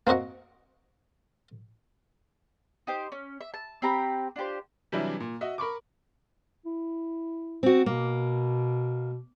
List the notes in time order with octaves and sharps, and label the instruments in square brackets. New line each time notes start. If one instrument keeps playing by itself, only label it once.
[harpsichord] A#3 C4 F#4 D#5 F#5
[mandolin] D#4 G4 C5
C#4
E5
A5
C4 G4 A#5 B5
D4 F4 G4 C5
[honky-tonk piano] C3 E3 F#3 G3 D4 E4
A#2
F#4 D#5 E5
A#4 B5 C#6 D6
[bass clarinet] E4
[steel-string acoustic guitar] C4 F#4
[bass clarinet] B2 [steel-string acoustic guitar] A#3